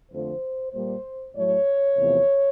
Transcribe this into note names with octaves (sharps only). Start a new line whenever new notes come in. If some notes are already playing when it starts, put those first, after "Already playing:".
F2 D3 F3 A3 C5
A#2 G3 A#3 C5
A2 F#3 A3 C#5
E2 C3 F3 A3